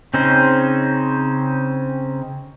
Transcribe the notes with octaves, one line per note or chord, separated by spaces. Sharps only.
C#3 C4 C#4 D#4 C5